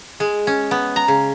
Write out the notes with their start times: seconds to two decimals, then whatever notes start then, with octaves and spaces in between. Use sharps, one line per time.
0.20 G#3
0.47 C#4
0.71 B3
0.96 A#5
1.08 C#3